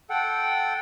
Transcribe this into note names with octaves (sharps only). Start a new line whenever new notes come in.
A4 F#5 G5